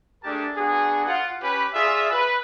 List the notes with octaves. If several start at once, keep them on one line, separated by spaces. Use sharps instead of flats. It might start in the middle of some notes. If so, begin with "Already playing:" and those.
A3 D4 G4 G#4 A#4 A5
B3 D4 F#4 G#4
F4 F#5
C#4 G4 B4
F4 G#4 D5 E5
B4